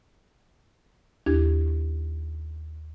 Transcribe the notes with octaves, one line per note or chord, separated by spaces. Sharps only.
D#2 D4 E4 G4 G#6